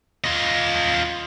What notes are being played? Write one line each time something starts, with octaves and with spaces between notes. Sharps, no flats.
F4 D#5